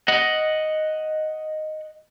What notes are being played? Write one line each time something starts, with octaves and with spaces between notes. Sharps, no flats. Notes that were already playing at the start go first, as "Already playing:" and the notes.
D#5 F#5